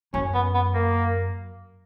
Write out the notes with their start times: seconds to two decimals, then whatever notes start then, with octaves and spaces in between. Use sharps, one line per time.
0.14 F#2 C#4
0.34 B3
0.55 B3
0.75 A#3